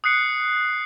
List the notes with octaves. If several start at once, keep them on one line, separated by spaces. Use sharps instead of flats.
D#6 F#6 C7 C#7